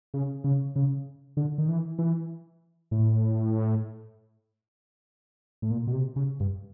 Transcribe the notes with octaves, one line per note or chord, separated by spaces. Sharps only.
C#3
C#3
C#3
D3
D#3
E3
E3
A2
A2
A#2
B2
C3
C#3
G2